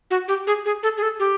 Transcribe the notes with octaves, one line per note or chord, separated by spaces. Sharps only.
F#4
G4
G#4
G#4
A4
G#4
A4
G4